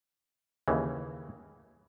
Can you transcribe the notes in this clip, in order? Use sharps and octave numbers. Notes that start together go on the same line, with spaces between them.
D#2 C#3 E3